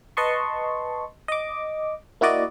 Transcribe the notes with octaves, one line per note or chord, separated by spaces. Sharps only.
B4 D#5 A5 C6 C#6
D#5 D6
A#3 E4 F#4 D5 D#5